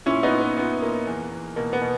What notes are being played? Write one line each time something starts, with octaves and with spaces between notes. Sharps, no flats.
A#2 C#4 E4
B3 D#4
A#2
B3
A#2 B3
A#2 A#3
E2
E2
B2 A#3
B3
B2